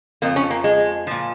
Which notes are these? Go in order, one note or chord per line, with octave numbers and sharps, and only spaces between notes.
F2 F3 A#3
C#4
A#3
G#3
A#2 F3